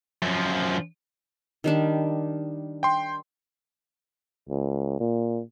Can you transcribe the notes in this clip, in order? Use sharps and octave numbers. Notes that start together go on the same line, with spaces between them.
F#2 F3
D#3 G3 D4
G5 C6
C#2
A#2